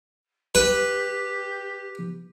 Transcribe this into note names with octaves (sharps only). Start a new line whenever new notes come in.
G4 B4